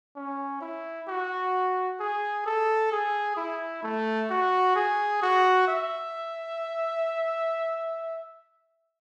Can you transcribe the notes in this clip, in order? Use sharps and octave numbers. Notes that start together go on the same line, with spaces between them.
C#4
E4
F#4
G#4
A4
G#4
E4
A3
F#4
G#4
F#4
E5